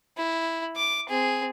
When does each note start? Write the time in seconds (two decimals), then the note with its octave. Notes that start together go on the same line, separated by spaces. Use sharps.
0.17 E4
0.77 D6
1.09 C4 G#4